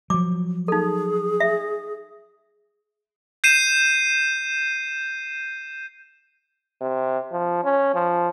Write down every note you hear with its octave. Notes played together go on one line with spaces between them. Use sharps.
F3 F#3 D6
D#4 G#4 A4
E5
G6 C7 D#7 E7
C3
F3
C#4
F3